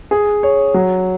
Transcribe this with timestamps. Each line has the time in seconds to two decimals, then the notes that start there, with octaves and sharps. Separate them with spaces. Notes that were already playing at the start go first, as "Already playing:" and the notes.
0.11 G#4
0.43 C#5
0.74 F#3